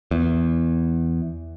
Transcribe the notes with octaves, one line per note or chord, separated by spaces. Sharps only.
E2